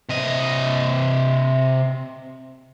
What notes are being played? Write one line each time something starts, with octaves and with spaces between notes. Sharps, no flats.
C3 D#5